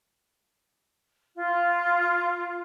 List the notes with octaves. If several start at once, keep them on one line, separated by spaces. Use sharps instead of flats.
F4